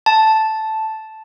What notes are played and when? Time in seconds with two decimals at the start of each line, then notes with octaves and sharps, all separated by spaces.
0.06 A5